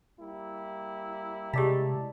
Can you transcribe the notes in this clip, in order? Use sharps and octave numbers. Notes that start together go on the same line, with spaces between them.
G3 A#3 E4
C3 G#3 G4 D5 A5 B6